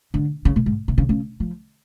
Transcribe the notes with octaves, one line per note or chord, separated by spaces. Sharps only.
D3
C#3
A#2
G#2
C3
C#3
C#3
F3